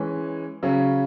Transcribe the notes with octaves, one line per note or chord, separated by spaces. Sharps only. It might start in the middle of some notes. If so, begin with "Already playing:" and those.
Already playing: E3 G#3 C#4
C#3 F#3 C#4